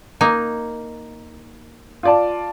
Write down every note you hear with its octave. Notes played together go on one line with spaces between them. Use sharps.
A#3 D#4
F4 D5 A5